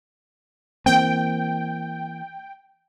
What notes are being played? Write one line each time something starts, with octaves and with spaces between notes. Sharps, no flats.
E3 A#3 C4 G5